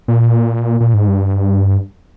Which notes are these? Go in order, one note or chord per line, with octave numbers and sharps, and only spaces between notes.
A#2
A#2
G#2
G2